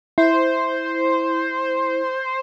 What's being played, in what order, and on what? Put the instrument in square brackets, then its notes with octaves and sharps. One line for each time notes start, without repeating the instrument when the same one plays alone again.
[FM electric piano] E4 [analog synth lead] C5